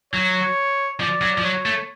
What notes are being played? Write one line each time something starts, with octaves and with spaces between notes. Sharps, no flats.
F#3 C#5
F3 D5
F#3
F3
F#3 C#5
A3